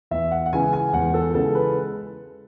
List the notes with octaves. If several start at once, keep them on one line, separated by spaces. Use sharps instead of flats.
E2 E5
F#5
F#5
C#3 E3 G#3 G#5
G#5
E2 F#5
A4
C#3 E3 G#3 A4
B4